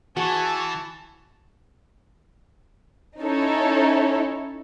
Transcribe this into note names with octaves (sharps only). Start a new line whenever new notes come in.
E3 F#4 G#4 A5 C#6
C#4 D#4 E4 A4 C#5